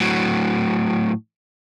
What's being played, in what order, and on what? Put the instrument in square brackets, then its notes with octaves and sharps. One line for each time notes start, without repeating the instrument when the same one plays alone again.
[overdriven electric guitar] A2 F#3